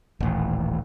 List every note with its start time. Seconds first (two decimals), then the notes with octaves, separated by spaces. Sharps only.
0.20 D#1 A1